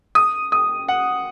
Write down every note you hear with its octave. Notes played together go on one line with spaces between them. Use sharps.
D#6
D#6
F#5